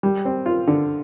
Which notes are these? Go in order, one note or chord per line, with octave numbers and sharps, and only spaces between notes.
G3
C4
F4
D3